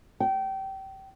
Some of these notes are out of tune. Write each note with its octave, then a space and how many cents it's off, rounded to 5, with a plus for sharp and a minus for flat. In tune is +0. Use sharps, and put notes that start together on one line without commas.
G5 -25